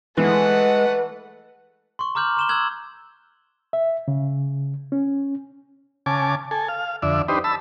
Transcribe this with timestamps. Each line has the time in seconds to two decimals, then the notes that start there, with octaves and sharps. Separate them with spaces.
0.17 E3 G#3 A3 B4 F#5
1.99 C6 C#6
2.15 A#5 D6 F6 G6 F#7
2.37 C6 E7 G7
2.49 E6 F#6 G#6 F#7
3.73 E5
4.08 C#3
4.92 C#4
6.06 C#3 G#5 A5 D6
6.51 A4 G#5
6.68 F5
7.02 F2 D3 D5 E5
7.28 D4 D#4 G4 B4 C5
7.44 A5 B5 E6